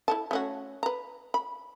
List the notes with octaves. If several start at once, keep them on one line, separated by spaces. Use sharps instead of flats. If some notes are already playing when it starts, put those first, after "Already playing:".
E4 A4 A5
A3 C#4 F#4
B4 A#5
B5